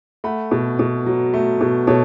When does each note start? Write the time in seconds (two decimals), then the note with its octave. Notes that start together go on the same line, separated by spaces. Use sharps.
0.24 A3 F#5 B5
0.51 B2
0.79 B2
1.06 F#3
1.33 A3
1.61 B2
1.87 B2 A4 C#5